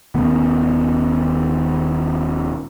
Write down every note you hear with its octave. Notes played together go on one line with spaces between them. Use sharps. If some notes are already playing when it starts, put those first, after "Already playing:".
D#1 D#3 A3 B3